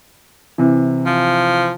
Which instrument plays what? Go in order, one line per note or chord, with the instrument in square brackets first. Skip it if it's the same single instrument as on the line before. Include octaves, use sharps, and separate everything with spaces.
[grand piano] C3 E3
[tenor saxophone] F3